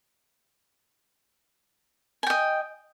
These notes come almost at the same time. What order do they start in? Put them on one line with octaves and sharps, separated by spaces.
G#5 G5 D#5